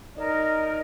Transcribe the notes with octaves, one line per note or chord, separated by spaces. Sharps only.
D#4 A#4 D5